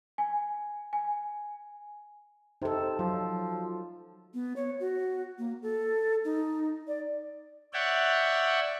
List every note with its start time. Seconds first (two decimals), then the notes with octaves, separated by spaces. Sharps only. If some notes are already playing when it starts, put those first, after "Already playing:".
0.18 G#5
0.93 G#5
2.62 C3 D#4 A4
2.99 F3 F#3
4.34 B3
4.56 C#5
4.80 F#4
5.38 A#3
5.62 A4
6.24 D#4
6.87 D5
7.73 C#5 D5 E5 F#5 G5